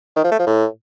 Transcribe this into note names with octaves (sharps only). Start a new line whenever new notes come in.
D#3
F3
A3
F3
A2